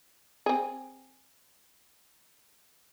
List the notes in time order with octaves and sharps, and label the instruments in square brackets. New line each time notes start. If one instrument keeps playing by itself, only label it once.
[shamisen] C4 G#4